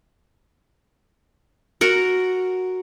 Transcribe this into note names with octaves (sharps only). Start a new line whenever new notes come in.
F#4 A#4 F#5